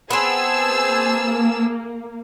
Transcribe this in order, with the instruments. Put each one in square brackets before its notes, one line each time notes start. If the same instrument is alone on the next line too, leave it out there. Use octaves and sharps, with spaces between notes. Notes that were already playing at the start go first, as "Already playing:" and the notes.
[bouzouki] B3 C4 [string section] G#4 A5 E6 [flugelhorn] C5
[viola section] A#3